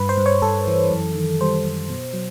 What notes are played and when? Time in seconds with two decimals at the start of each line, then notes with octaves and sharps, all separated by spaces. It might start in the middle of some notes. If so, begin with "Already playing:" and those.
Already playing: G2 B4
0.09 C5
0.18 G2
0.26 C#5
0.42 G2 A4
0.68 E3
0.91 F#2
1.15 D#3
1.41 G3 C5
1.65 F#2
1.89 B2
2.14 F#3